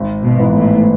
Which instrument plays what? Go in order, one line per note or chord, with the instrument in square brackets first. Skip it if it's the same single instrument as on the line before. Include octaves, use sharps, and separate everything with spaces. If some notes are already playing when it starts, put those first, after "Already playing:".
Already playing: [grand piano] G#1
[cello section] B2
[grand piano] G#2 E3 B3
[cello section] A2